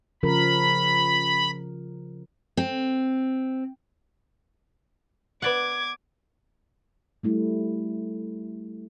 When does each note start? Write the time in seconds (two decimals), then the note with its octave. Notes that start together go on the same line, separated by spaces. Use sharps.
0.23 C#3 F3 A#4 B5
2.57 C4
5.42 B3 D5 F#5 D6 G#6
7.23 G3 A3 E4